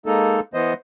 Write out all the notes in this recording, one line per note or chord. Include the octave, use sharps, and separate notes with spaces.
G#3 A#3 D#4 A4
E3 B3 C5 D#5